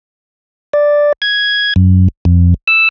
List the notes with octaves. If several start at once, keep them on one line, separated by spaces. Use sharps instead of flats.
D5
G#6
F#2
F2
E6